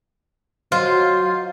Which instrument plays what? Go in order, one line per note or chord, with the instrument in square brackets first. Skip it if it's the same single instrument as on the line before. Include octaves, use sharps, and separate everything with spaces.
[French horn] F#3 [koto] F4 [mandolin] C5 D#5